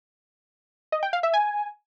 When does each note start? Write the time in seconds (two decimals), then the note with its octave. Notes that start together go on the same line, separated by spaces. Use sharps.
0.92 D#5
1.03 G5
1.13 F5
1.23 E5
1.34 G#5